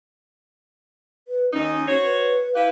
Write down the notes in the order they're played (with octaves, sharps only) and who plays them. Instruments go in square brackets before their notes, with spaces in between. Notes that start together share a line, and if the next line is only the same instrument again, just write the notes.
[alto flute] B4
[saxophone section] D#2 D#3 D#4 [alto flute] C#4
[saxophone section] F#4 C5 C#5
[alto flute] B4
[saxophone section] E4 G4 B4 [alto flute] F5